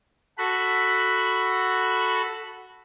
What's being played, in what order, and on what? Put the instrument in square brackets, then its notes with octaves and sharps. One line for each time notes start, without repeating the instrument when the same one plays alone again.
[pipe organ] F#4 A4 B5